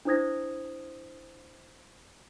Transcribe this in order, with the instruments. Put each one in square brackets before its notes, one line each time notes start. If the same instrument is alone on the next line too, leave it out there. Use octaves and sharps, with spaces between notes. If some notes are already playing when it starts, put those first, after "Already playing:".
[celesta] D4 E4 C5 D#6 G#6 A#6